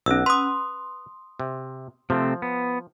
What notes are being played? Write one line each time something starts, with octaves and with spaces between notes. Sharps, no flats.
B1 C#4 E6
B4 C6 D#6
C3
C3 F3 A3 C4
B3